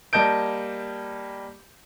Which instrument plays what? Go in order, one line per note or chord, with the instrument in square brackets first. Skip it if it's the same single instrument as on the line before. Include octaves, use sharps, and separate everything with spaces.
[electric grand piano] G3 A#3 D#5 A5 G6 D7